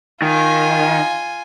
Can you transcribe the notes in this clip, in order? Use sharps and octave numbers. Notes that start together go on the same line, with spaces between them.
D#3 F4 G#5